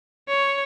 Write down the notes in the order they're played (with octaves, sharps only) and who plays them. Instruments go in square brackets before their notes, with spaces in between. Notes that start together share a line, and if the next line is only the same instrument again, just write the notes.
[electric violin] C#5